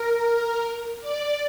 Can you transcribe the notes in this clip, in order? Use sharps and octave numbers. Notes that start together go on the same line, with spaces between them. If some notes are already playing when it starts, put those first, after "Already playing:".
Already playing: A#4
D5